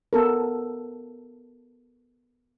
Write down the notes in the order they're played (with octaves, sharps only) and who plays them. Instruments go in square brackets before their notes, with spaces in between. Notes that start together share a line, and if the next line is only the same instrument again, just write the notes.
[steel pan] B3 A4 A#4